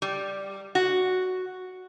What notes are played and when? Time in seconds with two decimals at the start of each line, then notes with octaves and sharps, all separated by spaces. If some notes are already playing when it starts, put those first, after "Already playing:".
0.02 G3
0.75 F#4